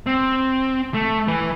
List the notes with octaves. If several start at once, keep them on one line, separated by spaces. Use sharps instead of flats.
C4
A3
E3 B4